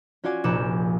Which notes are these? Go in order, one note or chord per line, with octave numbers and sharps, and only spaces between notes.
C#4 F4 F#4 D5 G#5
F1 A#1 D6 F#6 C#7 E7